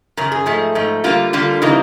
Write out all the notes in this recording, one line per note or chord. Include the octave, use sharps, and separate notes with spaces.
F#2 C#3 A#4
G#4
G#2 F3 A3
G#2 F3 A3
D3 G3 A#3 F4
D3 G3 A#3 F4
C#3 E3 G3 A#3 D#4